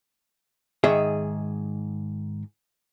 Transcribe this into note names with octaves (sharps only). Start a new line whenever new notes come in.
G#2 D#3 G#4 E5